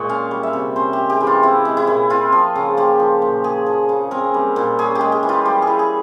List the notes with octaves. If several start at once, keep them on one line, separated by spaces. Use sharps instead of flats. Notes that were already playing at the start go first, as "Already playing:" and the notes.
Already playing: A#2 G#3 C#5
C#4 F5
G3
E5
C3
C#4 C5
G4
G#3
G4
E3
F4
C4 E4
G#3
E4
A#2
C4 F4
F3
C#3
A#3 G4
F3
A#2
A#3 G#4
F3
C#3
C4 A#4
G3
A#2
C#4 G#4
G4
G#3
G4
E3
F4
G3 G4
E3 G#4
G#4